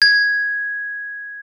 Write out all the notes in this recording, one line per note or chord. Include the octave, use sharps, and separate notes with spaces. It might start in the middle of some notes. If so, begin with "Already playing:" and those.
G#6